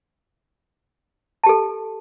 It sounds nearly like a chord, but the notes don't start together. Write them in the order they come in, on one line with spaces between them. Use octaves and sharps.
A5 G4 A4